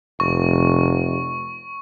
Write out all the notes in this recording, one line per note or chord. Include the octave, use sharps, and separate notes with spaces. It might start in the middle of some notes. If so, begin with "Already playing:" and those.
F1 C#6